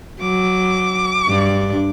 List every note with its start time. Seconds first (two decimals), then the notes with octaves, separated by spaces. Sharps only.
0.21 F#3 D6
1.28 G2 D4